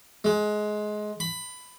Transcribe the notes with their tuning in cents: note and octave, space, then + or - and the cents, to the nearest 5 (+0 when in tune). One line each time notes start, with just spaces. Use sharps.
G#3 +20
B5 +15